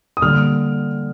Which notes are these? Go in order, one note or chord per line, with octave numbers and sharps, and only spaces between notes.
D#6
D3 G3 A#3 F6